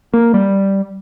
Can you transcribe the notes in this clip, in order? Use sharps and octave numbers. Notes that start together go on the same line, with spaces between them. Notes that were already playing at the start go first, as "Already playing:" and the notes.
A#3
G3